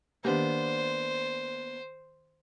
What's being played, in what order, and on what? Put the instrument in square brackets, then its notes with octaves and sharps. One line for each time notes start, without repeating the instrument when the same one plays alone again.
[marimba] D#3 G4 [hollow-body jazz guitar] A#3 B3 D4 [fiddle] C5